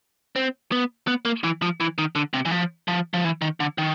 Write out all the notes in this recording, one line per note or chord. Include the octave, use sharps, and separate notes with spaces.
C4
B3
B3
A#3
E3
F3
E3
D#3
D3
C3
E3
F3
F3
F3
E3
D#3
D3
D#3